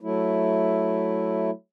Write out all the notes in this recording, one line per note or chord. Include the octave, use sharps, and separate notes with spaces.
F#3 A3 E4